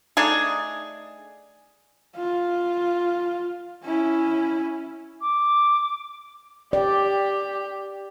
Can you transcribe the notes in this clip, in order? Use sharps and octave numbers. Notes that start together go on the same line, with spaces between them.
A3 D4 D#4 G#4
F4
C#4 E4
D6
G4 D5